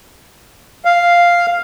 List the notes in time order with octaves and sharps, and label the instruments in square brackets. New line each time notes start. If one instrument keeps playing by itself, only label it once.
[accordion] F5